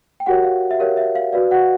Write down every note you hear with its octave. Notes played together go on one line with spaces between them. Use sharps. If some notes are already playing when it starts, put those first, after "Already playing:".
G5
F#4 G4 A#4 C#5 F#5
F5
E5
G4 A#4 C#5 F5
E5
F5
F#4 B4 D5 F5
F#4 F#5